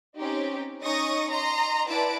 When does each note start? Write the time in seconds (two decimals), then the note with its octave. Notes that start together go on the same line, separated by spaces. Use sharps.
0.17 C4 C#4 D#4 G4
0.83 C#4 D#4 D#5 C#6 D#6 A#6
1.30 D#5 A#5 C6
1.89 E4 B4 D5 F#5 A5 D7